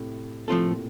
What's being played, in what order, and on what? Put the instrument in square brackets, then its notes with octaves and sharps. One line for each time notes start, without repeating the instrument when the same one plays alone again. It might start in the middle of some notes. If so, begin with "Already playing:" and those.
Already playing: [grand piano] A2 C3
[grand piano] A2 C3 [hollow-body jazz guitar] F3 A3 C4 F4 A4
[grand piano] A#2